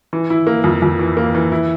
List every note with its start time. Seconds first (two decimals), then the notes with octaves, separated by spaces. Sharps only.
0.13 E3
0.30 E4
0.47 A#3
0.64 F2
0.82 F2
0.99 E3
1.17 A#3
1.35 E3
1.52 E4